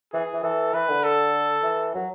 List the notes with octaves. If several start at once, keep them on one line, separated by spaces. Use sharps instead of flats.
E3 G#4
E3
E3 A4
E3 B4
D3
A4
E3
F#3